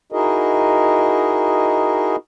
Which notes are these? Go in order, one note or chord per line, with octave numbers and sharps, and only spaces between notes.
D#4 E4 F#4 G#4 A#4 D#5